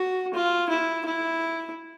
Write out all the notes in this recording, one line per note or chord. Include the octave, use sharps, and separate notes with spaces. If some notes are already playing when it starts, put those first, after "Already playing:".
Already playing: F#4
F4
E4
E4